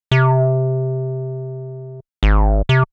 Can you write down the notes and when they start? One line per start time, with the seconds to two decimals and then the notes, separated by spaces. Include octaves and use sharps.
0.11 C3
2.23 G#1
2.69 C3